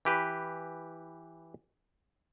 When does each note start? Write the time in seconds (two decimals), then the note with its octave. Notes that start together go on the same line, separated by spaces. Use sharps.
0.05 E3 G4 B4